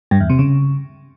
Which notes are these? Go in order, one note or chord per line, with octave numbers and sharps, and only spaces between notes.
G2
E2
C3
C#3